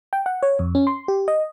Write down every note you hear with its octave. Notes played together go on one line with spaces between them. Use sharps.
G5
F#5
C#5
F2
C#4
C6
G4
D#5